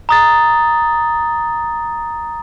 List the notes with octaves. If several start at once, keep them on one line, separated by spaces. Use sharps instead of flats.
A#5 D#6 A6